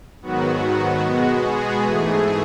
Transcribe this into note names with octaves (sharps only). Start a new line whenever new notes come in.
G#2 D#3 F#3 B3 F#4
F#4
B2 G#3 B3 F#4
G#4
G#2 E3 A3